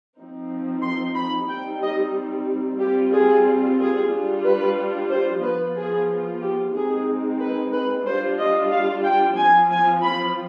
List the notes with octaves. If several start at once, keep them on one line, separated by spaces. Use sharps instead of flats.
F3 C4 D#4
C6
B5
G3 C4 D#4 G5
D#5
G3 C4 F4 G4
G#4
G#4
G3 D4 F4
B4
C5
F3 B3 F4 B4
G#4
G4
G#3 C4 D#4 G#4
B4
B4
G3 D4 F4 C5
D#5
F5
G5
F3 C4 F4 G#5
G#5
B5